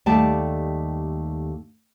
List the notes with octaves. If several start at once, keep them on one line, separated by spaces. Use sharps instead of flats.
D#2 G3 A3 D5 A5